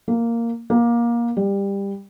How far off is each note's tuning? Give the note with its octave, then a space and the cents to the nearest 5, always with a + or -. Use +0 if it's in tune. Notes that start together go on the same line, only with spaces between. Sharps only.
A#3 -5
A#3 +20
G3 +20